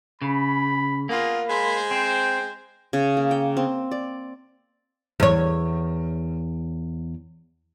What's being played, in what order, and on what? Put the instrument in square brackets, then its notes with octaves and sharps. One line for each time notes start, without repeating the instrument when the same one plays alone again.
[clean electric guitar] C#3 [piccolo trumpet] B5
[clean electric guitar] A#3 [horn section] B3 F4 G#4
[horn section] G#3 C5 [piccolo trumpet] B5
[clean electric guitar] C4 [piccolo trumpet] G5
[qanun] C#3
A#3
G5
C4
D5
[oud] E2 C#5